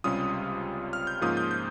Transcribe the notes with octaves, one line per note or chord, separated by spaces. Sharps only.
C#2 C3 G3 C#4 F4 D#6
F6
G6
G#2 F3 A#3 C#4 F4 D#6
G6
G6